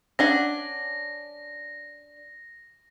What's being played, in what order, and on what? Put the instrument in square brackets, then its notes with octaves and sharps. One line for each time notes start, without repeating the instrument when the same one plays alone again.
[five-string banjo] C#4 D4 F#5 [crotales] A#6